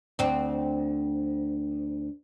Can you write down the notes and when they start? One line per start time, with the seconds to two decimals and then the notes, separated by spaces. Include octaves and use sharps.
0.19 D2 C4